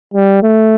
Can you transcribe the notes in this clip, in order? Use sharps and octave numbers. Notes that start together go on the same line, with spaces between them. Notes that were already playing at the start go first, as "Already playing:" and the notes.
G3
A3